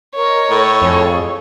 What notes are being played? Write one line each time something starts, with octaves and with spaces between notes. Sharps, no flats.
A#4 C#5 D#5
A2
F2 G#4 A4